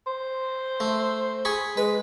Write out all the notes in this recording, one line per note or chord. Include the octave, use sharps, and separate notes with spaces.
C5
A3
G#4 B5 C#6
G#3 B4